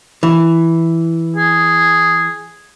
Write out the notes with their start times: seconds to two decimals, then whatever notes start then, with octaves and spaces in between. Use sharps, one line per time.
0.23 E3
1.36 G#4